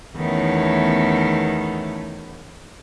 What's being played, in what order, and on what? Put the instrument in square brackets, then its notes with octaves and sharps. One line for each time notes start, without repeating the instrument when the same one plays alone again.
[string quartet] E2 D#3 A3 B3 C#4